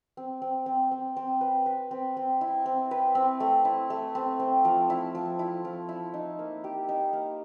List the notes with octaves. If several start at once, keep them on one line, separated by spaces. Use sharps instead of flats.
C4
C4
C4
C4
C4
B4
B4
C4
C4
E4
C4
B4
C4
A3
E4
A3
C4
C4
F3
E4
F3
E4
F3
E4
D#4
A#3
G4
D#4
A#3